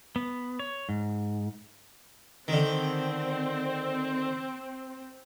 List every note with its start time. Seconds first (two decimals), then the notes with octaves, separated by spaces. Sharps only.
0.16 B3
0.59 C#5
0.89 G#2
2.48 D3 D#3 C4